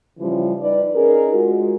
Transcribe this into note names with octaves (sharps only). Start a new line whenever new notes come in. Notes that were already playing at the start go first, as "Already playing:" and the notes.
C#3 E3 F3 G3
D#4 B4 D5
C#4 D#4 G#4 A#4
G#3 F4 F#4